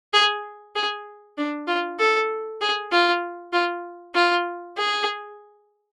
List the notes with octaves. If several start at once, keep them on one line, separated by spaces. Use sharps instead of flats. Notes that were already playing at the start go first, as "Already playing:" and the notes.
G#4
G#4
D4
F4
A4
G#4
F4
F4
F4
G#4